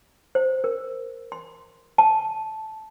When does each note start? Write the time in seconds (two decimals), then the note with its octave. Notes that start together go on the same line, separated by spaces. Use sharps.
0.35 C5
0.64 A#4
1.32 C6
1.98 A5